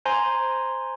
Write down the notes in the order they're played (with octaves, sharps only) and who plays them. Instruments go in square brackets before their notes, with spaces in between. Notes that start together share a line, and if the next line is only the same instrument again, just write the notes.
[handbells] C5 G#5 A#5 C6